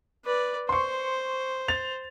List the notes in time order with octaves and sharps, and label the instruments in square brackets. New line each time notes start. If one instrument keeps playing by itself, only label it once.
[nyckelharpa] B4 D5
[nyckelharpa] C5 [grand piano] C6 C#6
[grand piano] A6 F7